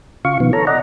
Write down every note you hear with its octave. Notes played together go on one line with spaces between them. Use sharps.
C#3 F4 F5 C#6
B2 D#3 F3 B3
A4 C#5 A#5
D5 D#5 F#5 A#5